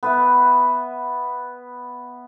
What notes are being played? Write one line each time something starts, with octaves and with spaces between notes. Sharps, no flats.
B3 B4 E5